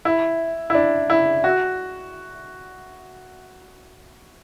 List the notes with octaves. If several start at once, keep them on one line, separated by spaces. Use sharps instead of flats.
E4
E4
D4
E4
F#4